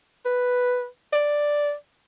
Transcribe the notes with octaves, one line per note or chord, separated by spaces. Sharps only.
B4
D5